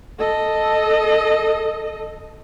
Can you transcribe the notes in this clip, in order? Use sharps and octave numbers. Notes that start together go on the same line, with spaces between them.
A4 D#5